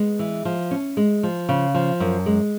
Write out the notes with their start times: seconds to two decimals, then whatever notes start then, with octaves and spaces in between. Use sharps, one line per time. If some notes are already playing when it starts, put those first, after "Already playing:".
Already playing: G#3 B3
0.19 E3
0.45 F3
0.71 C#4
0.97 G#3
1.23 F3
1.49 C#3
1.75 F3
2.00 F#2
2.26 G#3